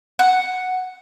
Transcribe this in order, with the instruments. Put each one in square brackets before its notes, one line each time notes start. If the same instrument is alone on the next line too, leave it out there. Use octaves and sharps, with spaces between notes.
[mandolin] F#5